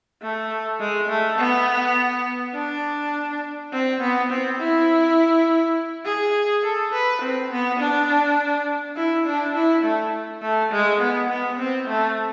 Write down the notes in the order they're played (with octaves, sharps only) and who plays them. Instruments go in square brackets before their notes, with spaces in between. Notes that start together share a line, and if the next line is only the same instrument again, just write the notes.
[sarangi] A3
G#3
A3
B3
D4
C4
B3
C4
E4
G#4
A4
B4
C4
B3
D4
E4
D4
E4
A3
A3
G#3
B3
B3
C4
A3